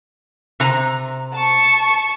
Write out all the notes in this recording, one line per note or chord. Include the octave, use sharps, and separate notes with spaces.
C3 A#5
A5 C#6